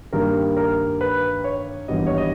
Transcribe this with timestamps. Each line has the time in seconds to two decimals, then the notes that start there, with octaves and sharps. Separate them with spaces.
0.13 G2 D#3 G3 A#3 A#4
0.57 A#4
1.01 B4
1.44 C#5
1.88 G#1 G2 E3 G3 B3 D#5
2.07 C#5
2.18 D#5